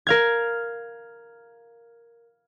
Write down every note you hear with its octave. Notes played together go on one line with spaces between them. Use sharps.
A#4 F5 G#6